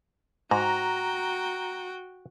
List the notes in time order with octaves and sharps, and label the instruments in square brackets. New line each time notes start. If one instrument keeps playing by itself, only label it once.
[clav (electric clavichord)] G#2 [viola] F#4 G5 [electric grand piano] A#5